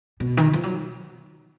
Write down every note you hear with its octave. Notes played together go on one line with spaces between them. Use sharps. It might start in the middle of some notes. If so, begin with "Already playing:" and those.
B2
D#3
F3
F#3